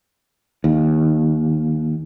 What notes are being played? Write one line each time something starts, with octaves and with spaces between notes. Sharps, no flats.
D#2